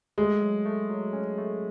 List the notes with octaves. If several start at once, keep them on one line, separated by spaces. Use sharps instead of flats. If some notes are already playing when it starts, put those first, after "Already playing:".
G#3 A3
F#3
A3
F#3
C#4
A3